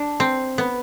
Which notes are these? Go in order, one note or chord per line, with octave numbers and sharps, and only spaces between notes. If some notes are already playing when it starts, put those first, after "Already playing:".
Already playing: D4
C4
B3